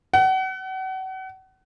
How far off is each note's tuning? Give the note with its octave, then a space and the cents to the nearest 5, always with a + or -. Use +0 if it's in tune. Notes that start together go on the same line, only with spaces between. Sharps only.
F#5 +35